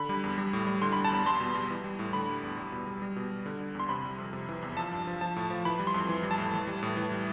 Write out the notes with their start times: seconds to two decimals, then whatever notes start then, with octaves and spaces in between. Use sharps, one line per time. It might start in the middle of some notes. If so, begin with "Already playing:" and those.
Already playing: D3 B5
0.09 G3
0.24 E2
0.38 G3
0.53 A2
0.67 G3
0.81 D3 C6
0.93 B5
0.96 G3
1.04 A5
1.12 E2 B5
1.25 G3 C6
1.40 B2
1.55 G3
1.70 E3
1.84 G3
1.99 A2
2.13 D3 B5
2.29 G3
2.43 E2
2.58 G3
2.72 B2
2.87 G3
3.02 G3
3.16 B2
3.31 G3
3.46 D3
3.60 G3
3.75 E2 C6
3.89 C3 B5
4.05 G3
4.18 F2
4.33 C3
4.49 E3
4.62 E2
4.77 F3 A5
4.91 G2
5.07 F3
5.21 F3 A5
5.36 A2
5.50 F3
5.65 E3 B5
5.79 G3
5.87 C6
5.94 F2
6.09 E3
6.23 G3
6.31 A5
6.38 A2
6.54 E3
6.67 G3
6.83 A2
6.97 E3
7.12 G3